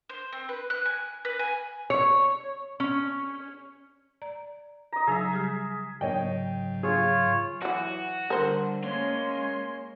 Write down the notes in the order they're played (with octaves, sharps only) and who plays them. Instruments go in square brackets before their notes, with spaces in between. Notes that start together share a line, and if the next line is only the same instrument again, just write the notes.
[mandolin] C5
C4
B4
F#6
G#5
B4
G#5
[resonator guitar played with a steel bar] C#5
C#4
[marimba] D5 A#5
[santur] D#5 A#5
[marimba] C#3 F#3 D#4 [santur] G#4 E5
[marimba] G3 G4 F6
[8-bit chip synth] G#2 C#3 F#3 [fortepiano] C#5 D#5 G5
[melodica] F4 C#5 [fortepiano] G#4
[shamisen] E3 F#3 [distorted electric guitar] F#4
[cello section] D3 G3 [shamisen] A#4 C5
[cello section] G#3 A#3 C#4 [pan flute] C#5 [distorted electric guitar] C6